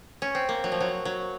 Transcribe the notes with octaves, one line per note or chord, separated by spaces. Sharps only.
C#4
C4
A#3
F#3
F3
F#3
F#3